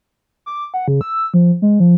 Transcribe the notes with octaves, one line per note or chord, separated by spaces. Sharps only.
D6
F#5
C#3
E6
F3
G#3
F3